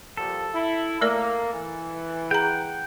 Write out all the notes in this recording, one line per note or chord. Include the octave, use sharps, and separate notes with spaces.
A#2 F3 G3 A4
E4
A3 A#3 A#4 D5
E3
G#4 F#5 G5 A#5